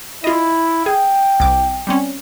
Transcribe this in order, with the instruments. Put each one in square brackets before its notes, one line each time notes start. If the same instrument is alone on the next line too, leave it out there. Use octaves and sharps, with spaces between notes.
[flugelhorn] E4 [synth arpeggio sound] F4 D#5
[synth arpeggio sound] G#4 [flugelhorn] G5
[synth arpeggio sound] C2 D6
G3 C4 C#4